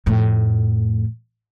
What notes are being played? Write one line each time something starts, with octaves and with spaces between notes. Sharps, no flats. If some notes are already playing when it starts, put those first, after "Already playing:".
F2 A2